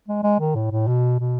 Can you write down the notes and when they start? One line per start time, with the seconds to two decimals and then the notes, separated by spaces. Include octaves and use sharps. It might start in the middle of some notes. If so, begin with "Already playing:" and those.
0.08 G#3
0.24 G#3
0.40 D#3
0.55 A2
0.71 A2
0.87 B2
1.20 B2